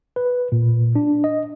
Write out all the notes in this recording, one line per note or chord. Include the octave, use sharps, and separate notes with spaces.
B4
A#2
D4
D#5